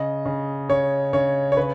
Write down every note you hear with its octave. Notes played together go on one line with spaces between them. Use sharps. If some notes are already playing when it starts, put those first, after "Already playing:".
Already playing: C#3 D#5
C#3
C#3 C#5
C#3 C#5
C#5
C#3 B4